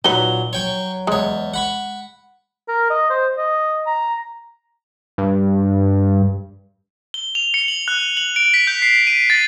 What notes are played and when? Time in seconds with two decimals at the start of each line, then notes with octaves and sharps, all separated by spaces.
0.04 A#2 F#3 D#4 B4 G7
0.53 F#3 C#5 G5 C#6
1.07 E2 G#3 C#5
1.54 F#5 B5 C#6
2.68 A#4
2.90 D#5
3.10 C5
3.38 D#5
3.87 A#5
5.18 G2
7.14 G7
7.35 F7
7.54 C#7
7.68 F#7
7.88 F#6
8.17 F#7
8.36 D7
8.54 B6
8.67 G6
8.82 C7
9.07 D#7
9.30 A6